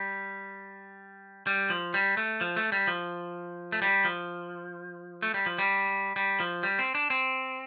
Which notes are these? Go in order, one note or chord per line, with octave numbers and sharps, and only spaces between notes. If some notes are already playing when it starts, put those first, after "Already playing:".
Already playing: G3
G3
F3
G3
A3
F3
A3
G3
F3
A3
G3
F3
A3
G3
F3
G3
G3
F3
G3
C4
D4
C4